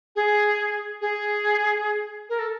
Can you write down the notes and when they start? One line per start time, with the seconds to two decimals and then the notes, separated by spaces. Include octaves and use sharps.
0.16 G#4
1.01 G#4
2.29 A#4
2.39 A4